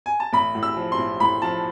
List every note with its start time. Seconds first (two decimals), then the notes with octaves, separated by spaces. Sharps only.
0.06 G#5
0.20 A5
0.33 A1 B5
0.55 A2
0.63 E6
0.77 F3
0.92 C6
0.98 A1
1.20 A2 B5
1.42 F3 A5